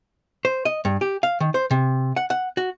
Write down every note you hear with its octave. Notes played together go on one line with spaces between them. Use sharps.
C5
D#5
G2
G4
F5
D#3
C5
C3
F#5
F#5
F#4